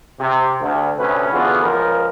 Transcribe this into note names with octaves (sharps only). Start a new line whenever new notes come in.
C3
D2
D2 C3 C#4 B4
D3 E3 B3 F4 F#4 G#4
C#2 F3 A#4